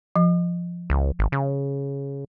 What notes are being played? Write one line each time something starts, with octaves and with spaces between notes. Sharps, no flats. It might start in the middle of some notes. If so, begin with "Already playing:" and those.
F3
C#2
G#1
C#3